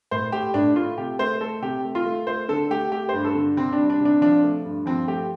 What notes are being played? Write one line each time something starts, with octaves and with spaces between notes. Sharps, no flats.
A2 C5
A3 G4
A2 D4
A3 F4
C3 G4
A3 C5
A3 A4
C3 G4
A3
F4
A3
A3 C5
D3 A4
A3 G4
A3 G4
G2 C5
A4
D3
C3 C4
D4
G3
D4
C3
D4
F3 D4
A3
G2
F3 C4
A3 G4